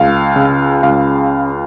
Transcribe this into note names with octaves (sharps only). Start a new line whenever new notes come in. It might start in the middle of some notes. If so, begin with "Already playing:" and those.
Already playing: C#2 F5
C#3
C#2 F5